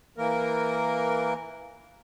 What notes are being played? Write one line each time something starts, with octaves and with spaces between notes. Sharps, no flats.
E3 A#3 A#4